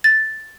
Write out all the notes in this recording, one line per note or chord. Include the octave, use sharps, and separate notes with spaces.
A6